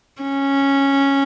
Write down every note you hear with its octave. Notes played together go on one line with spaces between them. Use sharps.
C#4